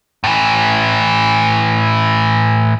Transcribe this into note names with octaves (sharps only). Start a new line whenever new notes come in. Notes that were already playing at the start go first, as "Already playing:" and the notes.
A2 E3